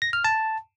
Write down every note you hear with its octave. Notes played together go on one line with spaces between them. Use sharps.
A#6
F6
A5